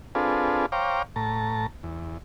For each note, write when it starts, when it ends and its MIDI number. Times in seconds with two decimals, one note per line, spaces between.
0.15 0.66 60
0.15 0.66 62
0.15 0.66 65
0.15 0.66 68
0.15 0.66 69
0.15 0.66 71
0.72 1.02 72
0.72 1.02 73
0.72 1.02 77
0.72 1.02 79
0.72 1.02 82
0.72 1.02 86
1.16 1.67 45
1.16 1.67 81
1.16 1.67 82
1.83 2.18 40